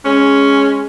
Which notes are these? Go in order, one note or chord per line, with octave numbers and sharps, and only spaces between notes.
G#3 C#4